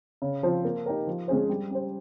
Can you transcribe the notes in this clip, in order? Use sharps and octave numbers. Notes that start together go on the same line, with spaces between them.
C#3
F3 C4 F4 C5
A#3
D#4 G4 A#4
F3
G#3 C#4 G#4 C5
G3
C#4 G4 C5